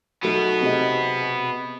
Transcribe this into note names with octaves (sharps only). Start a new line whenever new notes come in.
B2 F#3 A3 B3 D#4
C3 G#4 D#5